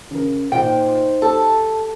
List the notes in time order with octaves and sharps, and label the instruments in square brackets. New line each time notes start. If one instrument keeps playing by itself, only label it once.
[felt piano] C#3 A#4
[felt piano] A#2 [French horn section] D#4 C5 [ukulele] G5
[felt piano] G4 [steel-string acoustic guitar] A4